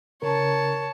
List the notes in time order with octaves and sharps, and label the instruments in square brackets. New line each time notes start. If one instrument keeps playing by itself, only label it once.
[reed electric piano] C#3 A#4 [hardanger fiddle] C#5 A5